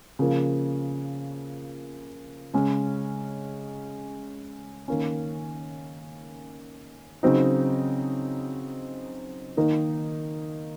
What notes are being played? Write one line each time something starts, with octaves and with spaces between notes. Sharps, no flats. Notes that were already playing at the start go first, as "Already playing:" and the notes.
C#3 F3 A#3
C#3 G#3 C#4
D#3 A#3 C#4
C#3 F#3 C4 D#4
D#3 A#3 D#4